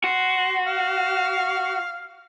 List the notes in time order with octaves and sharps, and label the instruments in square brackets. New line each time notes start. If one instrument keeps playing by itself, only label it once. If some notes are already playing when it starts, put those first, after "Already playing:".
[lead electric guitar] F#4 [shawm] C6
[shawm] F5